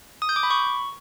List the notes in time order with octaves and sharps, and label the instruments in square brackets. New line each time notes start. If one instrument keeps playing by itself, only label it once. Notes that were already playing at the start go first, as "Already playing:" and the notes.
[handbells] D#6
G6
D6
B5
C#6